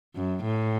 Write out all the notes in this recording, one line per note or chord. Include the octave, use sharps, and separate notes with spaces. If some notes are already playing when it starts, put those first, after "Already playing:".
F#2
A2